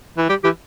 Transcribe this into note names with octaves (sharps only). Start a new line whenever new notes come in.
E3
G3 G4
E3 G4